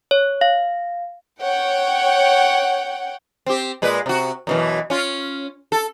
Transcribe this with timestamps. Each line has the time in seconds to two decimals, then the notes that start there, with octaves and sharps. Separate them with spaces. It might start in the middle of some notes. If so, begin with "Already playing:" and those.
0.11 C#5
0.41 F5
1.43 C#5 F#5 G5
3.46 C4 G4
3.82 A#2 G#3 B4
4.06 C3 F#4
4.47 F#2 B2 E3
4.90 C#4 F4
5.72 A4